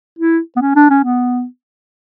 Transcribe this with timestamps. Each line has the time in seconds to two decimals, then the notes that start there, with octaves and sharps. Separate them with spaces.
0.19 E4
0.56 B3
0.61 C#4
0.76 D4
0.90 C#4
1.04 B3